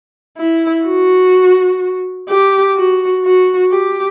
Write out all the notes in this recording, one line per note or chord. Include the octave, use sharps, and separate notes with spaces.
E4
F#4
G4
F#4
F#4
G4